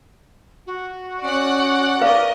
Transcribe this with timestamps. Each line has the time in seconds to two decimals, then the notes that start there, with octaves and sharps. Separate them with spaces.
0.67 F#4
1.24 C#4 D5 F#5
2.01 A#4 B4 D5 D#5 F5